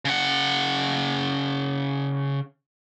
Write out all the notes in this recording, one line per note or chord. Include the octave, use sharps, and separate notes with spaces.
C#3 F#5